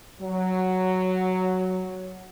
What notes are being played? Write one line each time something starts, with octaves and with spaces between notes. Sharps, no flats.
F#3